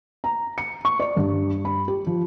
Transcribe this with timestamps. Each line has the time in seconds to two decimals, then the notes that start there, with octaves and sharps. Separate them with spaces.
0.24 A#5
0.58 C#7
0.85 C#6
0.99 D5
1.17 G2
1.65 B5
1.88 G4
2.07 F3